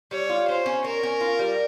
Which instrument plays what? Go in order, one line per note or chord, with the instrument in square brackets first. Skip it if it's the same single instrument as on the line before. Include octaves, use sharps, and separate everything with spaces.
[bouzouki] G3 [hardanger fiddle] C#5
[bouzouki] F4
[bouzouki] C#4 [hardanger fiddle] C5
[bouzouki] C#4
[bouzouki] C#4 [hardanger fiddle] A#4
[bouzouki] C#4
F4
G3